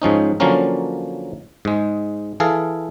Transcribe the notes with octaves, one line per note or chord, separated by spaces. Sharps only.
G#2 F3 C#4 D#4
D3 F3 F#3 A#3 C#4 A#4
G#2 G#3
E3 G#4 A4 F5